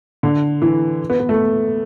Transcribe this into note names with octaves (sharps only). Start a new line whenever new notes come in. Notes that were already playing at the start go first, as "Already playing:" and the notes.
D3
E3
B3
B3
A3